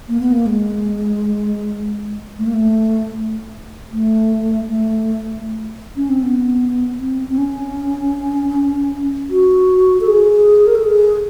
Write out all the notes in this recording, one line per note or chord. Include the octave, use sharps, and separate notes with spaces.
A#3
B3
A#3
G#3
A3
A#3
A3
A3
A3
C#4
C4
B3
C4
C4
C#4
F#4
A4
G#4
A#4
A4
G#4